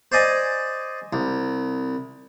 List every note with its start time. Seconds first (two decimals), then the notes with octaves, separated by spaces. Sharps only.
0.12 C5 D5 D#5 G#5
1.13 C2